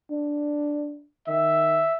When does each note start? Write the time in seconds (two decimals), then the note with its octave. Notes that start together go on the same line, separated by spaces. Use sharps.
0.11 D4
1.28 D#3 E5